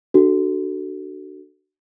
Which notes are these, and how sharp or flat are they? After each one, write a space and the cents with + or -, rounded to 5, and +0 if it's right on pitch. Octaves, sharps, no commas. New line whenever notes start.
D4 +30 F#4 +25 A4 +0